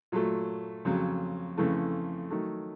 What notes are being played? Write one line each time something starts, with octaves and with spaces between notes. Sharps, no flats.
A#2 F#3 A3
F2 C#3 F#3
F2 C#3 E3 A3
D#3 F#3 A3